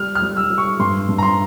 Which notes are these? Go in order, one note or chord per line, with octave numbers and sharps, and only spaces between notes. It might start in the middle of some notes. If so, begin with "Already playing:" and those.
Already playing: G3 F6
F6
G3
E6
G3
C#6
G2 C6
G2
A#5
C6